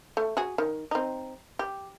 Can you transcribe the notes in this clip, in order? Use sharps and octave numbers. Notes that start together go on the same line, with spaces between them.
A3
F#4 G#4
D#3
C4 D#4
G4